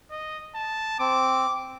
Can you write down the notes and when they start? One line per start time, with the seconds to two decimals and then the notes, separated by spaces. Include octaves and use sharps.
0.11 D#5
0.55 A5
0.99 C4 D6